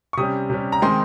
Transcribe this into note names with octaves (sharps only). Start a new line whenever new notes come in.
C#6
C3 G3 C#4 D#6
C3 G3 C#4
A#5
D#3 G#3 C4 D#4 C6